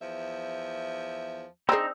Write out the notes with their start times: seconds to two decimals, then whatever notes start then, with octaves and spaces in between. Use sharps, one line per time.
0.01 E2 F3 E5
1.69 C4 D4 D#4 G#4 A#5 E6